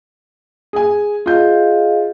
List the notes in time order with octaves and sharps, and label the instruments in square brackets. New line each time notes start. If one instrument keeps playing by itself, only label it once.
[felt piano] G#4 G#5
[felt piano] F4 G6 [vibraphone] G#4 D#5 F5